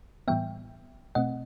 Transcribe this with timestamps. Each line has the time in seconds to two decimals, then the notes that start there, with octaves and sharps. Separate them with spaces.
0.28 A2 E3 G3 B3 E5 G5
1.15 B2 A3 C4 D#5 F#5